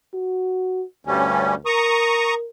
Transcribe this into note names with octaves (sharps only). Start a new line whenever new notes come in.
F#4
D2 G2 G3 C#4
A#4 A#5 C#6 D#6